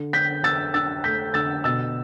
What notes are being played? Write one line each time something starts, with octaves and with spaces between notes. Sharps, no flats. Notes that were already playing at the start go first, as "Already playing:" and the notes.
Already playing: D3
D3 G6 B6
D3 E6 A6
D4 E6 A6
A3 G6 B6
D3 E6 A6
B2 E6 A6